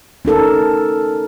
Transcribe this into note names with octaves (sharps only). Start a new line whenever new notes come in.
C#4 D#4 A4 A#4